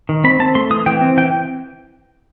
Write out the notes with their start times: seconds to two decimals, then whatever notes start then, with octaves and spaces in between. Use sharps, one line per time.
0.09 D#3
0.24 C4 B5
0.40 C4 A5
0.55 A3 C6
0.71 E3 D#6
0.86 E3 G5
1.01 C4
1.17 E3 G5